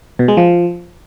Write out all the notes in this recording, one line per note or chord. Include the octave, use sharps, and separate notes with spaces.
B2
G#3
F3